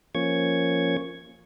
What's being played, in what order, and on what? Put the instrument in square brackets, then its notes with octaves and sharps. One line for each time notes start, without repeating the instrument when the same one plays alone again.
[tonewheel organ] F3 A#3 C#4 C#6 G#6